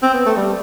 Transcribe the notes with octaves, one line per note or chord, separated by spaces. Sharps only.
C4
B3
A3
G3